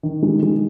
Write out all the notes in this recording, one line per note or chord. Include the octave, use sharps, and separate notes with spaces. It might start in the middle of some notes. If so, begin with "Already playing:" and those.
D#3
G#3
G#3